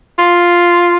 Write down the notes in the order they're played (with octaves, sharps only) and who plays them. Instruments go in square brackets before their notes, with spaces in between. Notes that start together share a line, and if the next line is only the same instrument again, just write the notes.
[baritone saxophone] F4